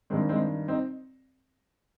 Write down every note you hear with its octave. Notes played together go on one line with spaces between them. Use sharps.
G2 D#3 G#3 C4
G#3 C4
C4 D#4